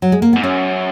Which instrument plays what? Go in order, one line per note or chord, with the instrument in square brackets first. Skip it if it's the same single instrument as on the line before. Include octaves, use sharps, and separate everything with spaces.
[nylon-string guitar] F#3
G#3
A#3
[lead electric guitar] G#2 [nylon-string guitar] B3
[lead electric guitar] F#2 [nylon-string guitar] C#4